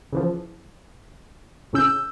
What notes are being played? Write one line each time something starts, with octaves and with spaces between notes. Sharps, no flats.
C#3 E3 F3
A2 C#3 C#4 E6 G6